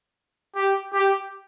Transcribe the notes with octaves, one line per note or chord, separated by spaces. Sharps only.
G4
G4